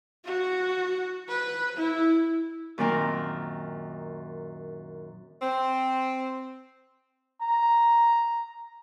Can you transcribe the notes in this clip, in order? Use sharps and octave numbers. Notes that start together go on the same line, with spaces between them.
F#4
B4
E4
F#2 A#2 D#3 C4 A#4 A#5
C4
A#5